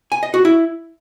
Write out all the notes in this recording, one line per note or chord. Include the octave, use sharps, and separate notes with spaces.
G#5
D#5
F#4
E4